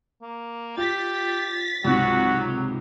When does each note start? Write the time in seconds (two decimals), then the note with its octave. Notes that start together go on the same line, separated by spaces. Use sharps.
0.22 A#3
0.77 F4 G4 A6 B6
1.84 C#2 G#2 C3 F#3 F#4